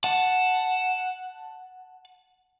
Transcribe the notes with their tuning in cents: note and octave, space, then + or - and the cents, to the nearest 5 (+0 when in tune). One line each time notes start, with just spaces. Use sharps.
F#5 +0 A5 +0